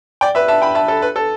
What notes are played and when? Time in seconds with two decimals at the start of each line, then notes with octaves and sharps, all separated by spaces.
0.21 D5 G5
0.35 B4 E5
0.48 E5 A5
0.62 G5 B5
0.75 E5 A5
0.88 A4
1.02 B4
1.16 A4